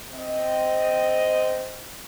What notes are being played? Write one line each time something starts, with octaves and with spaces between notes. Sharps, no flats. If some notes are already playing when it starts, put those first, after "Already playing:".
C4 D#5